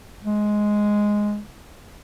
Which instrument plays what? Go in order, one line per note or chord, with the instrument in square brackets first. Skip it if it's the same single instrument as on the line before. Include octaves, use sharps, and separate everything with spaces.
[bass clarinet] G#3